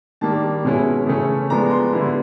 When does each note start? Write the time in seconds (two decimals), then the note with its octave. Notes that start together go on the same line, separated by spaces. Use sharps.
0.21 D#3 G3 A#3 D4 A5
0.65 B2 G#3 C#4 E4
1.06 C#3 E3 A3 C#4
1.50 F3 G#3 B3 D4 A#5
1.71 C6
1.92 D3 G3 B3 E4